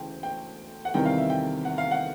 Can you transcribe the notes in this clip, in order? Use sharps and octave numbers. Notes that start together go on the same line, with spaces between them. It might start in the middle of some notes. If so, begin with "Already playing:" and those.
Already playing: D2 C#3 E3 G5
G5
F#5
E2 C3 D#3 G3 C4 G5
F5
E5
G5
F#5
F5
F#5